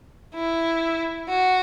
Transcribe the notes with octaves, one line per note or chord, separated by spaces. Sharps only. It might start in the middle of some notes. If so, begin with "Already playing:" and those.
E4
F#4